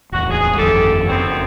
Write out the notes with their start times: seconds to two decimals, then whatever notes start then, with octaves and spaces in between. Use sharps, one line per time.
0.12 D1 E2 F#4
0.30 G#4
0.57 G1 F2 D#3 G4 A4
1.09 F#1 D2 B3 C4